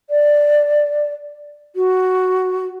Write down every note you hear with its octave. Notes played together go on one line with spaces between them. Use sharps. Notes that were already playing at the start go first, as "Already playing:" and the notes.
D5
F#4